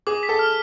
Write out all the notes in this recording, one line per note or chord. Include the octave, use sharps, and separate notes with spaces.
G#4 D6
B6
A4
F6